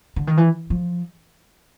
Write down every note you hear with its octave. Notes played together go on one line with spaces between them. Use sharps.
D3
D#3
E3
F3